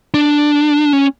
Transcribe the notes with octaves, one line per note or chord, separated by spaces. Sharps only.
D4
C#4